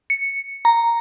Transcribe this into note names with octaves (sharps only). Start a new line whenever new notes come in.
C#7
A#5